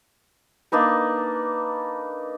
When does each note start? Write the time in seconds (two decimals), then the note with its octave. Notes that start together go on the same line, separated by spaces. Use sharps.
0.72 A#3 D4 D#4 B4